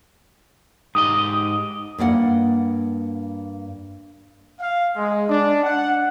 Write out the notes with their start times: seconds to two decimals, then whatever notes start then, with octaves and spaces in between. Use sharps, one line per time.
0.95 G#2 G4 D#5 D#6
1.98 G2 A#3 D5 F#5
4.60 F5
4.96 G#3
5.29 D4
5.64 F#5